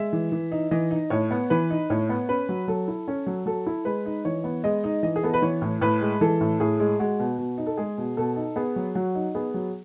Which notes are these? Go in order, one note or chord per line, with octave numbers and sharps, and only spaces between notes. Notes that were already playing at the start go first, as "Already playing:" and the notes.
Already playing: G#3 E5
E3
E3
D#4
E3 D#5
D#4
A2 C#5
B3
E3 B4
D#4
A2 C#5
B3
C#4 B4
F#3
F#3 A4
E4
C#4
F#3
F#3 A4
E4
G#3 B4
D#4
E3 C#5
B3
G#3 D#5
D#4
E3 D#5
G#4
B3 A4
B4
E3 C#5
A2
A2 B4
G#3
E3 A4
A2
A2 G#4
G#3
G#3 F#4
B2
B2
D#4
A4
G#3 G#4
B2
B2 A4
D#4
B3 G#4
F#3
F#3 F#4
D#4
B3 G#4
F#3